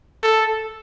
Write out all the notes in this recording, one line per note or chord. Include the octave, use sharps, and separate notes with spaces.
A4